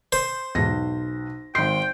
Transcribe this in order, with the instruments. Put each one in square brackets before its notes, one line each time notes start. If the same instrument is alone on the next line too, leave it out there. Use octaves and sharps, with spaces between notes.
[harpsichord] C5
[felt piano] B1 A#6 [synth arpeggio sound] E2 G#2
[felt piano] G#1 C7 [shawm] G5 [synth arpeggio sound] C6